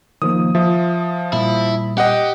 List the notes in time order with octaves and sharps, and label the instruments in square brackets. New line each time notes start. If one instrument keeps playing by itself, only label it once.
[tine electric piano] D#3 F3 A#3 [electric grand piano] D#6
[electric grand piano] F3 [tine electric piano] E5
[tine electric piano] A#2 G3 [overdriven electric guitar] E4
[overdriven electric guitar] G4 [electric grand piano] D#5 F#5